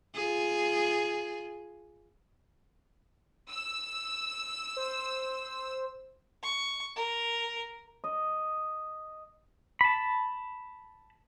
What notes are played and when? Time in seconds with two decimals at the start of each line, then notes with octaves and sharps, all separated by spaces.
0.14 F4 G#4
3.50 E6
4.76 C5
6.43 C#6
6.96 A#4
8.04 D#5
9.81 A5 B5